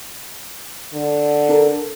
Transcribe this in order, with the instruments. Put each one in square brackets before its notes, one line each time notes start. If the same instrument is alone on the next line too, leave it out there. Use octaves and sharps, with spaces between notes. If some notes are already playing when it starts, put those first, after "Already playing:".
[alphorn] D3
[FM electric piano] D4 A4 A#4